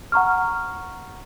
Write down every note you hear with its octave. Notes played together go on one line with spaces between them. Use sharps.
F#5 A#5 C#6 F6